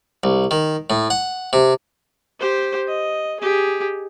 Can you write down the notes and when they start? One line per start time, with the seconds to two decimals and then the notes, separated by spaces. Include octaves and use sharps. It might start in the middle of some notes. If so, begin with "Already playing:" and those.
0.24 C2
0.51 D#3
0.90 A2
1.10 F#5
1.53 C3
2.40 G4 C5
2.88 D#5
3.40 G4 G#4